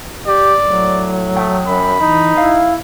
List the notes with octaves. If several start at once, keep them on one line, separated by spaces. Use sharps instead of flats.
G4 D5
A2 F#3
A3 G5 D#6
F#2 B5
E3 D#4
E4 F5